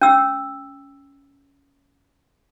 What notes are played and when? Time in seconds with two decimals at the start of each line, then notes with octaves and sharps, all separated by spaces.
0.01 C#4 E6